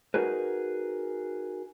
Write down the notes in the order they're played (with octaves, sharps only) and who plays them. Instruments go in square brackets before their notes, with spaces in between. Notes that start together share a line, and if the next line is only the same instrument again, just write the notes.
[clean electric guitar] D#4 F#4 G#4 A#4 B4